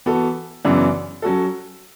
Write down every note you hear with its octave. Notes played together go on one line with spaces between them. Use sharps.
E3 B3 F#4 A4
F#2 C#3 E3 B3 D4
F#3 C#4 F#4 A4